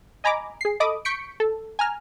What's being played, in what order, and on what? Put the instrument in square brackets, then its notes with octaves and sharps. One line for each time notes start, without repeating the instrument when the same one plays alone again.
[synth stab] D#5 G#5 A#5 B5 D6
G#4 C7
A4 D#5 B5 D6 D#6
C#6 G6 B6 C#7 D7
A4
G#5 A#5 F6